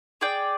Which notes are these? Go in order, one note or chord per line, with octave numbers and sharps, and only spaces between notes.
G#4 D5 G5